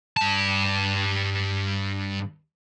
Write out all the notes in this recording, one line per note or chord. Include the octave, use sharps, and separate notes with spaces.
G2 A5